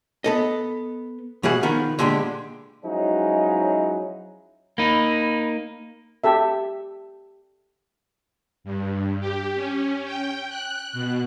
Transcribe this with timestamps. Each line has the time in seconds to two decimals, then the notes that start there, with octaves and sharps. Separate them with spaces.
0.24 B3 A4 D#5
1.43 B2 E3 G3 G#4 F#5
1.63 D#3 F3 B3 B4
1.99 A#2 D3 G#3 B3 G4
2.85 F3 F#3 G#3 C#4 D#4 E4
4.78 A#3 D#4 B5
6.24 G4 A4 E5
8.64 G2
9.20 G4
9.55 C#4
10.05 G5
10.49 F#6
10.93 B2